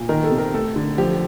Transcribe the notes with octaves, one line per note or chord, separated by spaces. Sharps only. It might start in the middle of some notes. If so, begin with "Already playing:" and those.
Already playing: A#2
D#3 A#4
A4
C3
A#4
A3 A4
D3
F3 G4